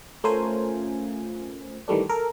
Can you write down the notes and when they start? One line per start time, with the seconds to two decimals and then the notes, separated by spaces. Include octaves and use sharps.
0.24 A3 C#4 F4 A#4 C5 G#5
1.88 D#3 E3 G3 A3 D4
2.09 A4 A#4